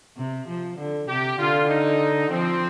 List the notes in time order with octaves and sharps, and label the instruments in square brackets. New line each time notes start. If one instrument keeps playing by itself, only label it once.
[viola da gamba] C3
F3
D3
[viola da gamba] C3 [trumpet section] G4
[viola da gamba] D3 [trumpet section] F4
[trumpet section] D#4
[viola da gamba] F3 [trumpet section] C4